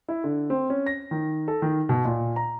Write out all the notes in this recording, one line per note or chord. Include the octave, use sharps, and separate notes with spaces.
E4
D3
C4
C#4
A#6
D#3
A4
D#3
B2
A#2
A#5